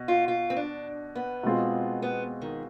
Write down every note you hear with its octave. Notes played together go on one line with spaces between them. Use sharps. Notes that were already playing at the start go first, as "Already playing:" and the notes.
Already playing: B2
F4
F4
C4
D4
B3
B2 G#3 C4 F4 G#4
B3
D#3